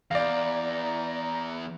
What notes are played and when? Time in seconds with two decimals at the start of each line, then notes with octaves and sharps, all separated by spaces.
0.11 E2 D5 F5 A#5